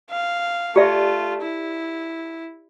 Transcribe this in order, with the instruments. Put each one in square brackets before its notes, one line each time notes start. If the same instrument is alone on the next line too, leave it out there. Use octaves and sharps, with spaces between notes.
[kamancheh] F5
[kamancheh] A3 F4 [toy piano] G4 D5 E5
[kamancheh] E4